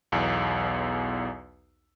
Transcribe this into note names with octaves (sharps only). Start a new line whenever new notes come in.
B1 E2